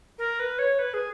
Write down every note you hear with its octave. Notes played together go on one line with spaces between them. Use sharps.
A#4
B4
C#5
B4
G#4